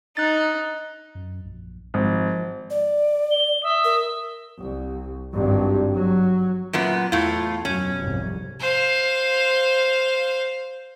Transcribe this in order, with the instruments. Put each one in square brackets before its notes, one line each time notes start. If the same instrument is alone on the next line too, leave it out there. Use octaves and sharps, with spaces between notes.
[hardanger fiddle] D#4 [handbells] F#6 A6
[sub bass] F#2
A#1
[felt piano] G#1 [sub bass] F3
[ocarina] D5
[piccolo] G7
[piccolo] E5 [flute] D#6
[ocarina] A#4
[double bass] C2
G#1 G2
F#3
[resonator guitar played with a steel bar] F#2 A#2 B3
[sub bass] E2 [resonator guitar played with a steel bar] A2 F4
[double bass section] F#2 B2 F#3 [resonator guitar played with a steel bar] C#4
[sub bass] E1 [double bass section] C2 F2 G#2
[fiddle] C5 F5